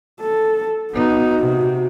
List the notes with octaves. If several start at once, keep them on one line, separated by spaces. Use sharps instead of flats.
A4
B3 D#4 F#4
C3